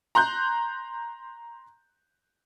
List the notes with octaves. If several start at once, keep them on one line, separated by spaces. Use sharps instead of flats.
A#5 C6 F#6 G6